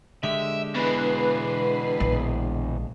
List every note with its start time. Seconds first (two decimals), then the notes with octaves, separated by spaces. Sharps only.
0.23 D3 G#3 G4 E5
0.75 B2 E3 B4 C7
2.00 A#1